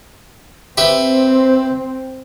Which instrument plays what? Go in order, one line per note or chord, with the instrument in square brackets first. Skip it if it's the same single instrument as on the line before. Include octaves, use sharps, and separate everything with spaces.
[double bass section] C4 [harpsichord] G4 B4 E5